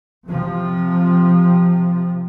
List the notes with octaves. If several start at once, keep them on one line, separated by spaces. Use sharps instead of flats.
C3 F3